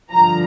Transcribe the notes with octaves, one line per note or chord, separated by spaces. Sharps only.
G2 D3 F3 A#5